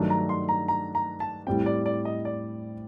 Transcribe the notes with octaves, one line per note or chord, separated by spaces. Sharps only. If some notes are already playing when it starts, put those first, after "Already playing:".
Already playing: G2 D#3 F#3 A3 D4
A#5
C6
A#5
A#5
A#5
A5
A2 G3 C4 G5
D5
D5
D#5
D5